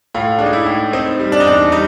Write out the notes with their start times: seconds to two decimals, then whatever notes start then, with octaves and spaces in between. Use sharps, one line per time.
0.15 A2 F4
0.39 G#3 D4
0.46 D#4
0.53 E4
0.66 A2
0.93 C4 D#4
1.20 G3
1.32 D4
1.40 D#4
1.45 E2 D4
1.72 G3 D#4